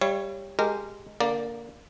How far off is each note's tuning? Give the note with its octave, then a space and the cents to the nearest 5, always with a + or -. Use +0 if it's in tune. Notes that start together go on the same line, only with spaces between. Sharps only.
G3 +15 C#5 +0 F5 -45
G#3 +0 G4 +0 A#4 -25
D3 -20 A#3 +0 D5 +0